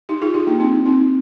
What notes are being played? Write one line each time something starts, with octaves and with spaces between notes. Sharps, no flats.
D#4 G4
F4 G#4
D#4 G4
A#3 D4
C4 D#4
C4 D#4